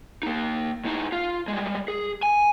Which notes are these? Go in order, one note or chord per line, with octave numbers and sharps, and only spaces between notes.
A#3 D#4
A2 D#4
F4
G3 G#3
G#4
G#5